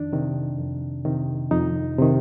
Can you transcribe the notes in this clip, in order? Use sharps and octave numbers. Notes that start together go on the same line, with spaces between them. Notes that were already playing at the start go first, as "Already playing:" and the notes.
Already playing: F2 D#3 D4
C3 D#3
F2
C3 D#3
F2 D#4
C3 D#3